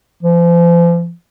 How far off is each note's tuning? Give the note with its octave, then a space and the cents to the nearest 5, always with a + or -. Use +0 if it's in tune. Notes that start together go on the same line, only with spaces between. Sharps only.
F3 -40